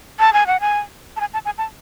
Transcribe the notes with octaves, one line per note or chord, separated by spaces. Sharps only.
A5
G#5
F#5
G#5
A5
G#5
A5
G#5
A5